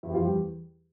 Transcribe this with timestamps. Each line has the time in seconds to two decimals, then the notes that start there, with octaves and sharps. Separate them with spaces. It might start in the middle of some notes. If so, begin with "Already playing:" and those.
0.03 E2 E4
0.10 G4
0.14 F3 F4
0.20 E2
0.25 G3 G4